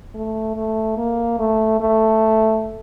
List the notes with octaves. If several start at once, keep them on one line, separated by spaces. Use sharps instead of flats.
A3
A3
A#3
A3
A3